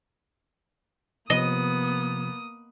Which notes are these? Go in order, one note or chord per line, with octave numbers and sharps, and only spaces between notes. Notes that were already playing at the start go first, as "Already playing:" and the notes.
C3 F3 A#3 B3 D#5 D#6